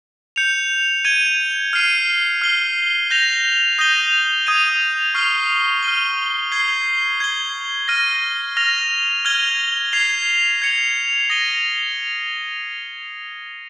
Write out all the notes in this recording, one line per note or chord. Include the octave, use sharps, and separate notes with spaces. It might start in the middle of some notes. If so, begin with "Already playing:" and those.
G6 C#7 F7
G#6 D#7 G7
F6 C7 D#7
F6 C7 G7
G6 A#6 F7
D#6 G6 A#6 D#7 G7
D#6 G#6 D#7 G7
C#6 F6 C7 G7
F6 C7 D#7 G7
G#6 C7 G7
G#6 C7 G7
F6 A#6 D#7 G7
F6 A#6 F7
F6 G#6 D#7 G7
G#6 C7 F7
G#6 C#7 F7
D#6 A#6 D#7 G7